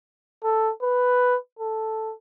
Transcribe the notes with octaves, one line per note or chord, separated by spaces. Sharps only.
A4
B4
A4